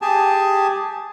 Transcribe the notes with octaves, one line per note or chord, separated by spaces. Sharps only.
G4 G#4 G#5 A5